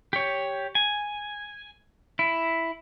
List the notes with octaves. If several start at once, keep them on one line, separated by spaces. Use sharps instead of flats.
G4 C#5
G#5
E4